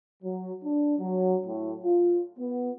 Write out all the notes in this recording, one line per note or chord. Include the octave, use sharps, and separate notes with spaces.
F#3
D4
F#3
A2
F4
B3